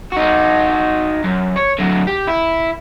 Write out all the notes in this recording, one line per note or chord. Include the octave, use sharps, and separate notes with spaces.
D#4 F#4
F#2
C#5
D3 F#3
G4
E4